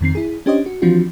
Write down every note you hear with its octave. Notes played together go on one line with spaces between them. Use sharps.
F2 D#3 C4 C7
E4 G#4
C#4 D4 G4 C5 C#5 D#5
F#4
E3 F3 C4 D4 F4 F#4